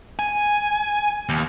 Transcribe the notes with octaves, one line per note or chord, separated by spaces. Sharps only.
G#5
D#2